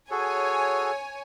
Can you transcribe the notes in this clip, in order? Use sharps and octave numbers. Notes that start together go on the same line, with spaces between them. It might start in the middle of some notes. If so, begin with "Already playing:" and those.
F#4 G#4 A4 C#5 G#5